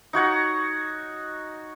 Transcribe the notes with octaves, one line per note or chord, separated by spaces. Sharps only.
D#4 F#4 C#5 F#5